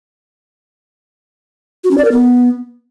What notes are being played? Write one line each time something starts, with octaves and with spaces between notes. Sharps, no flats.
F#4
C#4
D5
A#4
B3